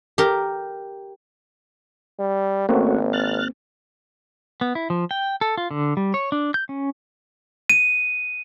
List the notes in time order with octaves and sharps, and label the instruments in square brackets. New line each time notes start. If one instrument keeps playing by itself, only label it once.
[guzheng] G4 A#4
[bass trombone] G3
[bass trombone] G#1 [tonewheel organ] A3 C#4 F#4 [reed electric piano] A#3 C4
[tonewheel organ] F6 F#6 A6
[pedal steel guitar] B3
E4
F3
G5
A4
F4
D3
G3
C#5
D4
G6
C#4
[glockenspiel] D#7